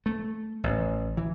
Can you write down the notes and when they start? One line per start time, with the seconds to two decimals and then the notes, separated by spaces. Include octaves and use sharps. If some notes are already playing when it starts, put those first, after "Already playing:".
0.06 A3
0.64 A1
1.17 E3